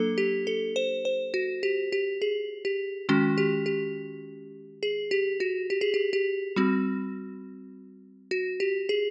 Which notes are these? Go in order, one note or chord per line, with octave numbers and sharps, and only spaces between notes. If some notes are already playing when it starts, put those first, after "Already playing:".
Already playing: F#3 A#3 D4 A4
G4
A4
C5
C5
F#4
G4
G4
G#4
G4
D#3 G#3 C#4 F#4
G4
G4
G#4
G4
F#4
G4
G#4
G4
G4
G3 C4 F#4
F#4
G4
G#4